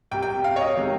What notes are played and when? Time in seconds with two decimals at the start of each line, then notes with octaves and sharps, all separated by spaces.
0.11 C2 C3 G3 G5
0.23 G5
0.44 F5
0.56 C#5
0.61 D#5
0.77 C3 D#3 G#3